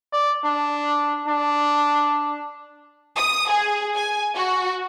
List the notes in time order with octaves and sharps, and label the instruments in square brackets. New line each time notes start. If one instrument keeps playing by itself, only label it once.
[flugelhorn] D5
D4
D4
[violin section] D#6
G#4
G#5
F#4